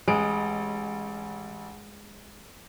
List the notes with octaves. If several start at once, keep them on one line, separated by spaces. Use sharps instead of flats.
A1 G#3 D7